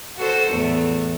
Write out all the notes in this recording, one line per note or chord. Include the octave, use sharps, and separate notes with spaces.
F#4 A4 C5
E2 A2 A3